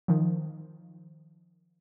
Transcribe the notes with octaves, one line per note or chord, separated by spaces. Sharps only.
D#3 F3